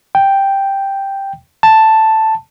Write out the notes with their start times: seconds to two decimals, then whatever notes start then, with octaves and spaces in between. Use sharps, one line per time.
0.15 G5
1.63 A5